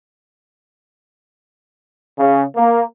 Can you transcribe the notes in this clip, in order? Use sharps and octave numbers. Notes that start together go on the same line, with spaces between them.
C#3
A#3